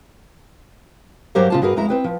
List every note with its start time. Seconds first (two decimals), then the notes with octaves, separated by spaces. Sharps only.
1.35 G2 F#3 G4 A#4 C5 F5
1.50 C#3 F4 A5
1.62 G2 F#4 G#4 A#4 B4
1.76 F2 G#3 E4 A#5
1.89 C4 B4 G5
2.04 F3